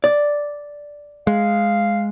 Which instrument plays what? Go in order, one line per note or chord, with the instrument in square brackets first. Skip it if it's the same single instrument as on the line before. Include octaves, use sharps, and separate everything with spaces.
[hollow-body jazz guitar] D5
[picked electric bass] G#3 [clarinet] F5